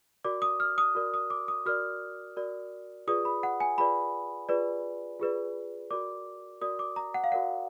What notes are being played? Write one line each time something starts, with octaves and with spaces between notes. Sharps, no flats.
F#4 A#4 D5 D6
D#6
F6
D#6
F#4 A#4 D5
D#6
D6
D#6
F#4 A#4 D5 F6
F#4 A#4 D5
F4 G#4 B4 D5 D#6
B5
F#5
G#5
F4 G#4 B4 D5 B5
F4 G#4 B4 D5
F4 G#4 B4 D5
F#4 A#4 D5 D6
F#4 A#4 D5 D#6
D6
A#5
F#5
F5
F#4 A#4 D5 F#5